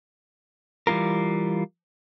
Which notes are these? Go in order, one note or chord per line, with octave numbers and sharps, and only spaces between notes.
E3 G3 D4 F4 A#4